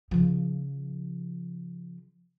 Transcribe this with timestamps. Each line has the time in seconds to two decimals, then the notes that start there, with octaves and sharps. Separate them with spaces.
0.11 C#3 F3